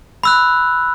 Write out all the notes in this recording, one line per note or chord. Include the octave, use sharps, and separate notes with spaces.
B5 E6 F#6